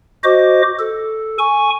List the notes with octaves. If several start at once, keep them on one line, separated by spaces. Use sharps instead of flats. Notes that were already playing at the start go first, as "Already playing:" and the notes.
F#4 C5 D#5 D6
A4
G#5 C#6